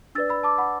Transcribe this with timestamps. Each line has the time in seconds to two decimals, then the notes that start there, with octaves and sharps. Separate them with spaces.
0.15 D4 B4 D5 E6 A6
0.29 B5 E6
0.43 A5 D6
0.58 F#5 B5